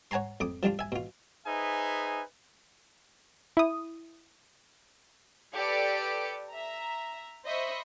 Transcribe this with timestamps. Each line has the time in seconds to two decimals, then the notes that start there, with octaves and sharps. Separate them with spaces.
0.11 C#5 F#5 G#5 A#5 C6
0.40 F2 D6 D#6
0.63 F3 G3 D4 F4
0.79 E5 G#5
0.92 B2 F4
1.47 D#4 G#4 B4 C5 E5 G#5
3.57 E4 D#6
5.54 G4 A4 B4 D5 C#7 D7
6.50 E5 A#5
7.45 C5 D#5 E5 B5 C#6